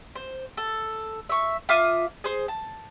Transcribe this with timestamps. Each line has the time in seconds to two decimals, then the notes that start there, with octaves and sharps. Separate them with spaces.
0.15 C5
0.57 A4
1.29 E5 C#6
1.69 F4 E5 D6 D#6
2.24 G#4 C5
2.48 A5